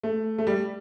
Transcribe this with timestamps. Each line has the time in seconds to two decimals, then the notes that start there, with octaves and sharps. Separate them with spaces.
0.03 A3
0.38 A3
0.47 G3